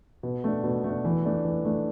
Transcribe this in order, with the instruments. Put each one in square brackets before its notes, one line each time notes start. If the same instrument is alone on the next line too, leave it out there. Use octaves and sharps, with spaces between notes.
[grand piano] B2
A3 D4
B2
A3 D4
E3
A3 D4
E3
A3 D4